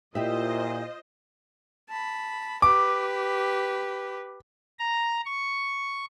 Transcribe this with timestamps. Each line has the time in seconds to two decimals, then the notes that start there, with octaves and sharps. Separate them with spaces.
0.15 A#2 E4 F4 G4 C5 D#5 E5
1.90 A5 B5
2.62 G4 B4 D6
4.79 A#5
5.26 C#6